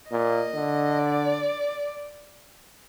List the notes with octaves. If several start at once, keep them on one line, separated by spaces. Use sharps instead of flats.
A#2 D#5
D3
D5